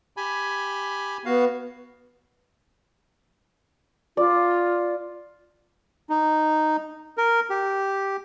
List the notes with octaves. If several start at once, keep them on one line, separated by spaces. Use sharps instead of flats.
G4 G#5 B5
B3 F#4 F5
F4 D5
D#4
A#4
G4